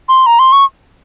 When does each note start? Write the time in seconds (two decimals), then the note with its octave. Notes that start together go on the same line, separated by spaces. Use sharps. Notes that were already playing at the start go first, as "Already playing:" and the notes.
0.08 C6
0.26 A#5
0.39 C6
0.52 C#6